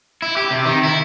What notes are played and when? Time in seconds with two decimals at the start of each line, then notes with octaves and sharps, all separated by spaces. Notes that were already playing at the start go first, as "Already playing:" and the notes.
0.22 E4
0.37 G4
0.51 C3
0.66 D#3
0.83 E4